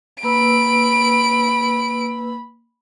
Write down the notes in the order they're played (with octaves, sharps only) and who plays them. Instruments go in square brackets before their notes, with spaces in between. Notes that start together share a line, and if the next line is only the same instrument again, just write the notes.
[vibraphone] A#3 B4 E6 [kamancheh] B5 [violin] D7